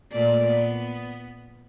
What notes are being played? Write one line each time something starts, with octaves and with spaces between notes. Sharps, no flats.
A#2 A3 D5
B3